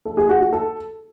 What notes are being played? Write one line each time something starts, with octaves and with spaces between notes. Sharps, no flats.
A4
G#4
F#4
F#4
A4